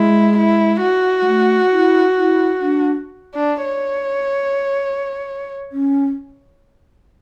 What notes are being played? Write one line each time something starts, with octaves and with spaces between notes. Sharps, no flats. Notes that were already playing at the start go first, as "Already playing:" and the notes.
Already playing: G#3 E4
E4
F#4
G#3
A3
E4
E4
D4
D4
C#5
C#4